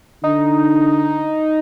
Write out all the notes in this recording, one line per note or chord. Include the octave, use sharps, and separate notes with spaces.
D3 D#4